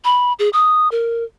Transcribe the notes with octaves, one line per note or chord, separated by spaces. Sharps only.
B5
G#4
D#6
A#4